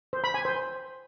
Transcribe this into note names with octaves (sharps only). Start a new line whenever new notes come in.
C5
B5
G#5
C5